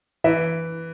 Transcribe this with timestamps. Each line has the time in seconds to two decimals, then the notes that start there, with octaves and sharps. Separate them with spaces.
0.24 E3 E5